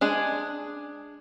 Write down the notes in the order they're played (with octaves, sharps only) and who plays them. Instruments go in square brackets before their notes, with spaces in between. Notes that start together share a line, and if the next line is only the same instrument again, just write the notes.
[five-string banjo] G#3 D4 G#4